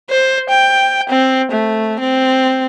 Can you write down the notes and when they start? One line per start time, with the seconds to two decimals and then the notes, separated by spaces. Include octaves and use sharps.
0.10 C5
0.50 G5
1.10 C4
1.52 A3
2.00 C4